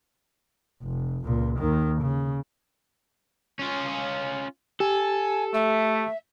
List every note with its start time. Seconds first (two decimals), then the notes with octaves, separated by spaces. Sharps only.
0.82 F1
1.25 C#2 A#2
1.59 D#2 D#3
2.01 C#3
3.59 C#4 F4
4.80 G4 A4 G#5
5.54 A3 E5